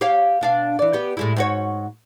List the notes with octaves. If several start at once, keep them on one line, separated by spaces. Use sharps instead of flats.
G4 C#5 F5
B2 D4 F5
E3 D5
B3 G4
A2 G#3 E4
G#2 F#4 C#5